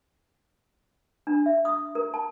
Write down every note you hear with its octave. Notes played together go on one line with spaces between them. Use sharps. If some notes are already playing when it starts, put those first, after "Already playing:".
D4
E5
D#6
A#4
A5